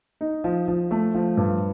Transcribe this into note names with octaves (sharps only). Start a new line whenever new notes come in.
D#4
F3
F3
A3
F3
G2